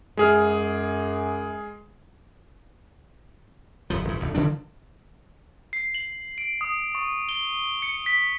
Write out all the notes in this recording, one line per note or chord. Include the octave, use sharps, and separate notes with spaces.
F#2 G#3 G#4 F6
D#1 F#2 F3
E1 G#2
F1 D2
E1 D3 F3 D4
C7
F#7
D7
D#6
C#6
G7
C#7
B6